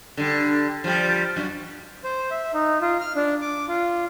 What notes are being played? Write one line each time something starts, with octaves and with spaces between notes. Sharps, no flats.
D3 G3
F3 G3
F#2 F#4
C5
E5
D#4
F4
F6
D4
D6
F4